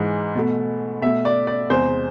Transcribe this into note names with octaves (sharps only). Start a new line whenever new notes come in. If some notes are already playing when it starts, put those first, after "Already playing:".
Already playing: G#2 E3 G#3
B2 A3
B2 A3 E5
D5
D5
E2 C3 G#3 C5